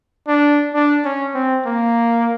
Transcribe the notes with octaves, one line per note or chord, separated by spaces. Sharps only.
D4
D4
C#4
C4
A#3